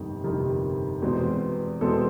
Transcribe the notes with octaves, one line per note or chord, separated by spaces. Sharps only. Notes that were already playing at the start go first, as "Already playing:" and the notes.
Already playing: G1 F2 C3 D#3
G1 F2 C3 D#3 A#4
E2 B2 G#3 C4
E2 B2 G#3 C4 A4